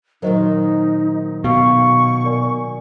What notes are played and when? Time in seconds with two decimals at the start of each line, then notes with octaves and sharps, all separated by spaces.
0.22 A#2 D#3 F#3 D#4 A#4 C5 D#5
1.44 B2 F5 C#6
2.24 A#4 D5 G#5